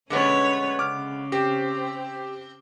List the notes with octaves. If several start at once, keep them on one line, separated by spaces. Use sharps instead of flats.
D3 G#3 B3 C#4 B4 C#5
C#3 D6 F6
C4 G4